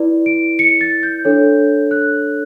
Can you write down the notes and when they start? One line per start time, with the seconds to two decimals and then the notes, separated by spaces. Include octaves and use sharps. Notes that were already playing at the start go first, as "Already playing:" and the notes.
Already playing: E4 B4 D5
0.26 D7
0.59 C#7
0.81 A6
1.03 G6
1.25 D4 A4 C#5
1.91 F#6